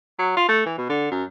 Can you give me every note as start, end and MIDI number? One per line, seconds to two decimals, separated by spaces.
0.19 0.35 54
0.37 0.48 65
0.49 0.62 57
0.66 0.74 52
0.78 0.85 47
0.90 1.11 50
1.11 1.24 42